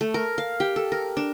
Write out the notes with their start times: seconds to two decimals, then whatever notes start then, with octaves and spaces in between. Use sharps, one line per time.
0.01 A3
0.14 A#4
0.38 F5
0.60 G4
0.76 A4
0.92 A#4
1.17 D4